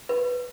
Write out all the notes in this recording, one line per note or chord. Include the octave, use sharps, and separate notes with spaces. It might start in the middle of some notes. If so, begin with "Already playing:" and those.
B4